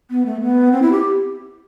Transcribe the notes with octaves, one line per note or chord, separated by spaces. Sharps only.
B3
A3
B3
C4
E4
G4